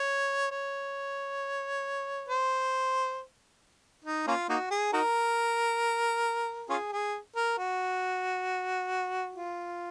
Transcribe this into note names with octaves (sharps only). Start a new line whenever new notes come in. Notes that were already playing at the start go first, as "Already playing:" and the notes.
Already playing: C#5
C#5
C5
D#4
A#3 C#4 F4
A#3 D#4 F#4
G#4
D#4 F#4 A#4
C#4 F4 G#4
G#4
A#4
F#4
F4